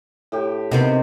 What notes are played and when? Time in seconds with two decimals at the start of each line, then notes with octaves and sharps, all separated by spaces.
0.32 A2 G4
0.71 C3 D#3 B3 C4